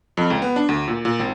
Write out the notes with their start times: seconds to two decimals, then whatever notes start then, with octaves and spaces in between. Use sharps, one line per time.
0.17 F2
0.30 C#2
0.42 B3
0.56 D4
0.69 D2
0.88 A#2
1.05 A#2
1.19 G#1